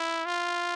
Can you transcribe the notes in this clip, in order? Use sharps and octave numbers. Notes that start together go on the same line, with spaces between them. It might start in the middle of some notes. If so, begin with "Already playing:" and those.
Already playing: E4
F4